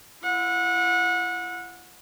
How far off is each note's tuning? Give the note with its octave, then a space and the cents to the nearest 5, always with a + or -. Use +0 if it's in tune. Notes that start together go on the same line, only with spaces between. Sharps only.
E4 +35 F#5 -30